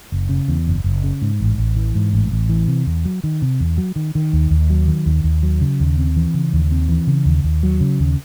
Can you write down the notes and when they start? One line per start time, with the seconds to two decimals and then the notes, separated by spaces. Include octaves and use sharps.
0.12 F#1
0.29 C#3
0.48 E2
0.67 F#1
0.84 F#1
1.04 C#3
1.22 G#2
1.40 A1
1.58 A1
1.76 E3
1.95 G#2
2.13 A1
2.32 A1
2.49 E3
2.67 C3
2.86 E2
3.05 F#3
3.24 D#3
3.42 C3
3.60 E2
3.78 F#3
3.96 D#3
4.15 D#3
4.33 D#2
4.51 D#2
4.70 F#3
4.87 D#3
5.06 D#2
5.24 D#2
5.43 F#3
5.61 C#3
5.80 D#2
5.98 C4
6.16 E3
6.34 C#3
6.53 D#2
6.72 C4
6.89 E3
7.07 C#3
7.25 D#2
7.44 D#2
7.63 F#3
7.81 C#3
8.00 D#2